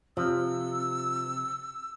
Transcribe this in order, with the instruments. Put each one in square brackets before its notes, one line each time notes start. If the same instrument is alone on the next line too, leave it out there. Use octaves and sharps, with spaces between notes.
[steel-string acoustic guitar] C3 [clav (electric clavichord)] F3 [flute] E6